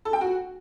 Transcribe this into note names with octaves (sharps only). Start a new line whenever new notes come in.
A4
G5
F#4